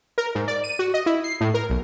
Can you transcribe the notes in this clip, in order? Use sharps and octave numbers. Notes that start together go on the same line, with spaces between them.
A#4
G#2
D5
D#7
F#4
D#5
E4
C7
A2
A#4
B1